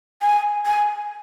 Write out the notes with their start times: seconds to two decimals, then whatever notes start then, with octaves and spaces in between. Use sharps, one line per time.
0.22 G#5
0.66 G#5